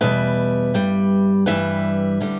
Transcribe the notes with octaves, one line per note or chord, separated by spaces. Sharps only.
E2 B2 G3 B4 E5
G2 G3
G2 E3 G3 B4 E5
D3 G3